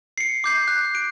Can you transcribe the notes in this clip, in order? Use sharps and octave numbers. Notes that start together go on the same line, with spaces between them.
C7 C#7
D6 G6 C7
F#6
D7